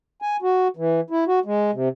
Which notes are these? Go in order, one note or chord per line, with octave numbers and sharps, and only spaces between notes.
G#5
F#4
E3
E4
F#4
G#3
C3